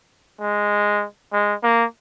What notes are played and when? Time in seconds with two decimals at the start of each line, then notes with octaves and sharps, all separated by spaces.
0.40 G#3
1.33 G#3
1.63 A#3